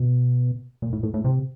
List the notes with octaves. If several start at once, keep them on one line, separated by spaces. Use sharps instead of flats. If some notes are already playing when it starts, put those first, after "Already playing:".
Already playing: B2
A#2
A2
A2
A2
C3